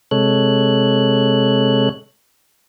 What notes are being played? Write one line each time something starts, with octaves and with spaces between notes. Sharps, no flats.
C3 G#3 A4 C#5 F#6